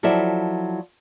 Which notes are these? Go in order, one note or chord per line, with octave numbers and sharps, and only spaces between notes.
F3 F#3 E4 A4 D5 E5